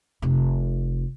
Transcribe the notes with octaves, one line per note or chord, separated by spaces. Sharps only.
F1 C3